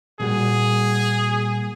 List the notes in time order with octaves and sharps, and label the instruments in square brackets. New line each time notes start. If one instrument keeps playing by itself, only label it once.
[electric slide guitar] A#2 G3 F#4 [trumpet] G#4